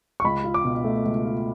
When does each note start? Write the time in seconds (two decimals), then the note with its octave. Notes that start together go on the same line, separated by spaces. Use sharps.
0.20 C#6
0.24 C#2 B5
0.44 F4
0.54 D6
0.65 B2
0.84 A3
1.05 C#2
1.25 F4